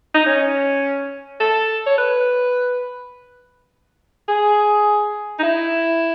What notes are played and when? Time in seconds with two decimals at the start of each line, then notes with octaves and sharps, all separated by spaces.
0.15 D#4
0.26 C#4
1.40 A4
1.86 C#5
1.98 B4
4.28 G#4
5.39 D#4
5.43 E4